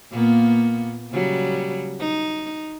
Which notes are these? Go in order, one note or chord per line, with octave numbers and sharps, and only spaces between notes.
A#2 A#3 B3
C#3 F#3 G3
D#4